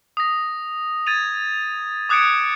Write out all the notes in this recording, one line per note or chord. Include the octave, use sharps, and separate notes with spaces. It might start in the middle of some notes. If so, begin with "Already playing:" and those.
D#6 A#6
G#6 A6 D#7 F7
D6 D#6 F#6 G#6 C#7 D7